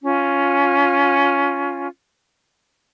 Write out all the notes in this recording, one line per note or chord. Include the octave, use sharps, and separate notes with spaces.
C#4 F4